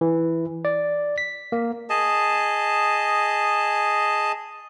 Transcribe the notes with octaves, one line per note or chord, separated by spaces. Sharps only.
E3
D5
B6
A#3
G#4 D#5 A5